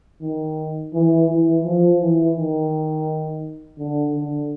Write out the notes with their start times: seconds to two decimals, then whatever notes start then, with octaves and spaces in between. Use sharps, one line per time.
0.21 D#3
0.94 E3
1.29 E3
1.64 F3
2.00 E3
2.36 D#3
3.79 D3
4.15 D3